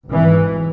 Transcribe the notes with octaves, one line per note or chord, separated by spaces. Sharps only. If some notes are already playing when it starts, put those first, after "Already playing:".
G#1 G#2 E3